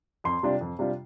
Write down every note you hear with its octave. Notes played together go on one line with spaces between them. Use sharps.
F2 C6
C3 G3 D4 F4
F2
C3 G3 D4 F4